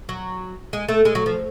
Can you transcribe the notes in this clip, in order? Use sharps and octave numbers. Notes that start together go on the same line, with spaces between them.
F#3
G#3
A3
G#3
F#3
F3